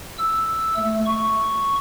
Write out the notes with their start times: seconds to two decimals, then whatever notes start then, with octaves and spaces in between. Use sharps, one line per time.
0.19 E6
0.76 A3
1.05 C#6